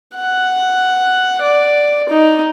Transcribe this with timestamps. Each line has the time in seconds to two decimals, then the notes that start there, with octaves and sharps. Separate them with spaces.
0.15 F#5
1.42 D5
2.10 D#4